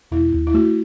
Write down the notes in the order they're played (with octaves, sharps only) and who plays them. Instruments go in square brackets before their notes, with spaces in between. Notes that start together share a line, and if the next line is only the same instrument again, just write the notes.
[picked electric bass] E1 [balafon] E4
[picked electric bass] D#2
[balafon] E4
[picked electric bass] A3 [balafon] F#4